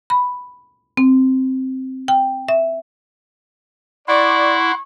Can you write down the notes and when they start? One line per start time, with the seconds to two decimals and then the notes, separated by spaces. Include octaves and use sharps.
0.10 B5
0.97 C4
2.08 G5
2.48 E5
4.08 E4 D5 F#5 C6 C#6